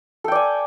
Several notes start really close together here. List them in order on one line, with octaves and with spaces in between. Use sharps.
A4 G5 D5 G#5